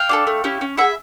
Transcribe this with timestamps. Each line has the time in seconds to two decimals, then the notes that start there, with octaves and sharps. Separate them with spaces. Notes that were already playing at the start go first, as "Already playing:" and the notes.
Already playing: F5 G5
0.09 D4 F4 A4
0.27 A3
0.44 C#4 E4 G4
0.61 C#4
0.77 E4 G#4 E5 F#5